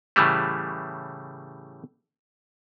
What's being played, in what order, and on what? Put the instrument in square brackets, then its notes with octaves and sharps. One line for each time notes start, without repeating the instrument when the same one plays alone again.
[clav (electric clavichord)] A2 C#3 E3 G3 A3